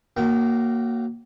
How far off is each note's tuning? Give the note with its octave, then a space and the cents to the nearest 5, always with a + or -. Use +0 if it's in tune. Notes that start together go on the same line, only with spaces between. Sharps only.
F#3 +0 A#3 +0 G5 -30